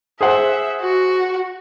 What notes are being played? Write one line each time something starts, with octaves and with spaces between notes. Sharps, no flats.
G#4 C5 E5 F#5
F#4